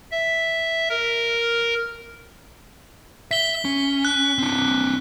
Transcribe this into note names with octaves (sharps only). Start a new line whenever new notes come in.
E5
A#4
E5 B6 G7
C#4
F#6
C4 D4